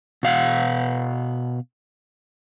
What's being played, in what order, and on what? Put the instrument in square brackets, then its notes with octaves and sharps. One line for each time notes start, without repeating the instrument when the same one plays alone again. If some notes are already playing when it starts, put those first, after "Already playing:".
[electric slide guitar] B2 F5 F#5